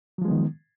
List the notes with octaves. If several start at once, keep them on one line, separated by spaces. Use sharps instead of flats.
D#3 F3 F#3 G#3 B3